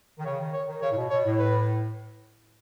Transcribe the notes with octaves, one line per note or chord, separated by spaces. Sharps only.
D#3
C#3 C#5
D#3
C#5
D#3
C#3 C#5
A2
B2
B2 C#5
A2
B4